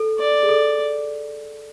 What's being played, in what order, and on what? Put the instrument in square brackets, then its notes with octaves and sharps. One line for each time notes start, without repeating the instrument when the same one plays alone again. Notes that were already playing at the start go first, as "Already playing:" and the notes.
Already playing: [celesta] A4
[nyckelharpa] D5
[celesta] G#4
A4